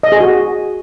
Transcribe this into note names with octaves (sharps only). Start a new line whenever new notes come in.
D#5
G#4
F#4